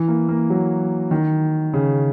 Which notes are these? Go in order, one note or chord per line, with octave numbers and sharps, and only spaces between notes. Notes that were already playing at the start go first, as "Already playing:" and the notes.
Already playing: E3
A#3
A#3
F#3
D#3
C#3